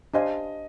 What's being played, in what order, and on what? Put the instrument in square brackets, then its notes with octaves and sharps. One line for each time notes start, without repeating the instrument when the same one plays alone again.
[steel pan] D4 G4 C5 F5 G#5 [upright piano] D#5